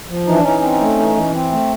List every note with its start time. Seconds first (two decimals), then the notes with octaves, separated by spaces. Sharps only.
0.08 F3
0.26 E3 D#4
0.35 D4
0.43 E3 C#4 D#4
0.62 C4
0.80 A3
0.98 E3
1.16 E3
1.34 C4
1.52 A3